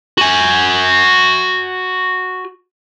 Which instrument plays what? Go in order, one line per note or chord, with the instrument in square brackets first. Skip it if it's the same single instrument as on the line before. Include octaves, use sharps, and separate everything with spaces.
[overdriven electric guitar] F#4 G#5